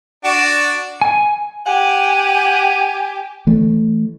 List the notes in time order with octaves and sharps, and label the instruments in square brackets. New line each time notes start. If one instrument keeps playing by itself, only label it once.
[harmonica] D4 F#4
[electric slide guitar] G#5
[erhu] G4 [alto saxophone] F#5 [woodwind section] G#5
[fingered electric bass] E3 A3